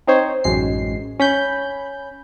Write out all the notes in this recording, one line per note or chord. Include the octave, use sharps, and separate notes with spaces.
C4 D#4 C5 C#5
A1 F#2 G#3 C7
C#4 B5 G6